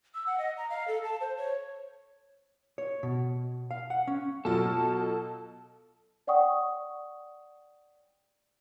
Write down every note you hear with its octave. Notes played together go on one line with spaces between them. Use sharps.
E6
F#5
D#5
A#5
F5
A4
A5
C5
C#5
C#5
B2
F5
F#5
C#4
B2 F#3 F4 A4
C#5 D5 F#5 G5 C#6 D#6